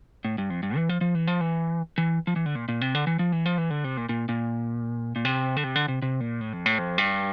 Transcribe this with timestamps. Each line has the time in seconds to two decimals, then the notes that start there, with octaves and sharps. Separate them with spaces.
0.25 A2
0.38 G2
0.50 F2
0.63 G2
0.76 E3
0.89 F3
1.01 F3
1.15 E3
1.27 F3
1.41 E3
1.98 E3
2.27 F3
2.36 E3
2.46 D3
2.55 A#2
2.69 A#2
2.81 C3
2.95 D3
3.07 E3
3.19 F3
3.32 E3
3.46 F3
3.58 E3
3.70 D3
3.84 C3
3.97 A#2
4.09 A#2
4.29 A#2
5.16 A#2
5.25 C3
5.57 D3
5.64 C3
5.76 D3
5.88 C3
6.02 C3
6.20 A#2
6.41 A2
6.53 F2
6.66 A2
6.79 F2
6.98 G2